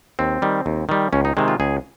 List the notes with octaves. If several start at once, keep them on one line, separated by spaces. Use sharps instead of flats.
D#2 C4
D#3 G3
D#2
D#3 G3
C#2 C#4
D#4
C3 D#3 G#3
F4
C#2 G#4